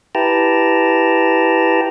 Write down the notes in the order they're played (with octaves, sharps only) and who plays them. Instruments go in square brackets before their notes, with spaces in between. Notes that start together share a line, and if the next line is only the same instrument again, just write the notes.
[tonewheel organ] E4 G4 B4 G5 A5 A#5